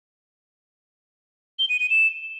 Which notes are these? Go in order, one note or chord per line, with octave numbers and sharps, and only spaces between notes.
G7
D#7
D#7
E7